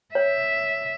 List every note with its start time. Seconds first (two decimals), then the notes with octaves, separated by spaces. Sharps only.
0.15 C#5 E5